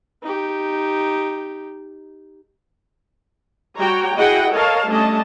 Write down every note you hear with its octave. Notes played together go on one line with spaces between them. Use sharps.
D#4 G4
G3 F#4 C#5 G5 A#5
E4 F#4 G#4 D#5 F#5 G5
A4 A#4 C#5 D#5 F5 A5
G3 A3 C#4 D4 D#5 A5